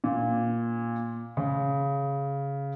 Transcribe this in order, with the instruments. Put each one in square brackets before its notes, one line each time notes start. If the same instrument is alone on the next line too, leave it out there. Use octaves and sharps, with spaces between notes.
[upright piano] A#2
C#3